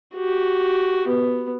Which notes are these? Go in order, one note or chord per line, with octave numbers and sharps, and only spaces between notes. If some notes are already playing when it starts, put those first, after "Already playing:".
F#4 G4
B3